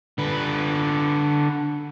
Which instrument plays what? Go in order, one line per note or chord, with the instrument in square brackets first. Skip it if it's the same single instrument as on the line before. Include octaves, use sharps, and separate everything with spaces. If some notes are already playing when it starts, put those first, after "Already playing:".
[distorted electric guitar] D3 B4